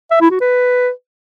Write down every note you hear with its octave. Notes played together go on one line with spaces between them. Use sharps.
E5
E4
F#4
B4